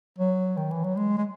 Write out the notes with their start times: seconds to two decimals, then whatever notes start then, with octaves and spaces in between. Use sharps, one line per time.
0.19 F#3
0.57 D#3
0.71 E3
0.84 F#3
0.96 G#3
1.18 G#3